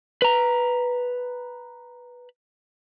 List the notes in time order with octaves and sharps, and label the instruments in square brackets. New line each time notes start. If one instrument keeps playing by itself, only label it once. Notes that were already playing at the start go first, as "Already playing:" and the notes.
[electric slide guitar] B4 A#5